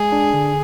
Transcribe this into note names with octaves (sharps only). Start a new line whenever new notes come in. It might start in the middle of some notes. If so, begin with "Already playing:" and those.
Already playing: G#3 G#4
D4
D3